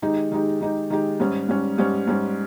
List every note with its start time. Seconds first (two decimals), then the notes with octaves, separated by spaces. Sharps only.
0.02 D#3 G#3 D#4 G4
0.32 D#3 G#3 D#4 G4
0.61 D#3 G#3 D#4 G4
0.90 D#3 G#3 D#4 G4
1.20 G#2 G3 C#4
1.48 G#2 G3 C#4
1.78 G#2 G3 C#4
2.07 G#2 G3 C#4